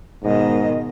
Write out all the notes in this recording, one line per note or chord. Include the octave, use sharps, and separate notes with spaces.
G#2 B2 D#3 D#5